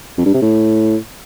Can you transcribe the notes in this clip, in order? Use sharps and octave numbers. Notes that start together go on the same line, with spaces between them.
F2
G2
C3
A2